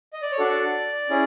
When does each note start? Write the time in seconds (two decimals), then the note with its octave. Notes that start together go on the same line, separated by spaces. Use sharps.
0.13 D#5
0.22 D5
0.31 C#5
0.38 D4 F#4 A4 D5
1.10 C#4 E4 G#4